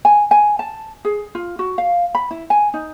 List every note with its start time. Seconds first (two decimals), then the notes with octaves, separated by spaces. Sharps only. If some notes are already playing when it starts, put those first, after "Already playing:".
0.05 G#5
0.31 G#5
0.59 A5
1.05 G#4
1.35 F4
1.59 F#4
1.78 F5
2.15 B5
2.31 E4
2.50 G#5
2.74 D#4